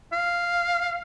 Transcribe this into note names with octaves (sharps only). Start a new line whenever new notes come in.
F5